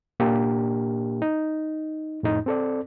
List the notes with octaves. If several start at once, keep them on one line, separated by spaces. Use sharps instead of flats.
A#2 A#3 D4 G4 A#4
D#4
F2 A2 D#4
C4 A4 D5